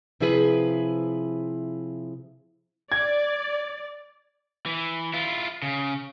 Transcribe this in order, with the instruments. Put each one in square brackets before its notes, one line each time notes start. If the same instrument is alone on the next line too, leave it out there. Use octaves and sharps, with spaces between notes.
[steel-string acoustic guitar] C3 F3 E4 G#4 B4
[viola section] D5 [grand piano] G#6
[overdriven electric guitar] E3
E4 F4
C#3